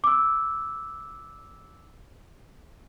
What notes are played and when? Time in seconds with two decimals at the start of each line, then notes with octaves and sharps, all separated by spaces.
0.04 D6 E6